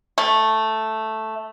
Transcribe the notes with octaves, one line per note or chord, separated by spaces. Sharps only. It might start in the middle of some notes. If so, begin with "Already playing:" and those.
A3